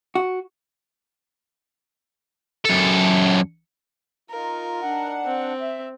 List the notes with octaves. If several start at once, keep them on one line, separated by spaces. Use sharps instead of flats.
F#4
F#2 A4
D#4 F4 A#4
D4 F#5
C4
E5